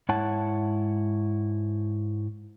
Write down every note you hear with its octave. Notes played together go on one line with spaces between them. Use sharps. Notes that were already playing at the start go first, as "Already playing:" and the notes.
G#2 E4 C#5 F#5 A5